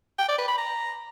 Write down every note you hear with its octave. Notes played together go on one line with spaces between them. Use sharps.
G5
D5
B4
B5
A#5